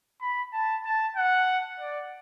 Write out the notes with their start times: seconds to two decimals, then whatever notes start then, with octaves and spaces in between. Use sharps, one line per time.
0.21 B5
0.53 A5
0.85 A5
1.17 F#5
1.80 D5